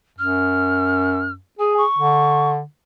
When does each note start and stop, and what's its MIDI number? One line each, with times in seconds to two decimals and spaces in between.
0.19 1.38 42
0.19 1.32 89
1.59 1.84 68
1.59 1.74 80
1.78 2.50 85
1.98 2.63 50